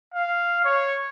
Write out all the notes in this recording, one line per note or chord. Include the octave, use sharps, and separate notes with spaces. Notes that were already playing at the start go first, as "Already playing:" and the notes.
F5
C#5